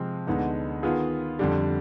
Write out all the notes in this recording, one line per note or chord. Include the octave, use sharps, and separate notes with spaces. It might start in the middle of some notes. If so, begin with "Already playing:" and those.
Already playing: C3 F3 G#3 C4
D2 D3 G#3 B3 D#4
D#3 B3 F4 G#4
F2 D3 G3